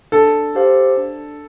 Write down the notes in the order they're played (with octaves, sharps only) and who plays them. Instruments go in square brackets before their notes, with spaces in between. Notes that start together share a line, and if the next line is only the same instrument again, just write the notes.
[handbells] D4 [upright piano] A4
[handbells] G4 C5 F5
D4